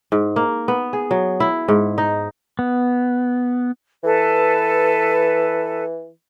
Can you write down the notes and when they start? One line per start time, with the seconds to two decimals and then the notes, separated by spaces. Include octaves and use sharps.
0.12 G#2
0.36 A#3
0.68 B3
0.93 G#4
1.11 F#3
1.40 E4
1.68 G#2
1.98 D#4
2.59 B3
4.04 E3 A4 B4